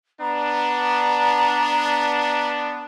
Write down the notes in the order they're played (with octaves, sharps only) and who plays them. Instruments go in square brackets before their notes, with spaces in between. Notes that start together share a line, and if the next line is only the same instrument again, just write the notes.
[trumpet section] B3 D4 [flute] A#5